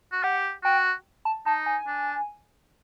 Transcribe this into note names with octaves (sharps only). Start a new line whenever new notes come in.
F#4
G4 F#5
F#4 G5
A5
D#4 A5
G#5
D4